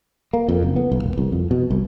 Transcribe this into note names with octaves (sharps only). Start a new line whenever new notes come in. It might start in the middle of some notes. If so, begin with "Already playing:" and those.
A#3
F2
F#1
B3
B1
E1
C2
F2
B2
C2